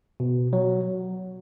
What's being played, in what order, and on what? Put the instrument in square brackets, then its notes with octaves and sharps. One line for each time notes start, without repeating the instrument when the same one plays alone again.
[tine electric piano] B2
F#3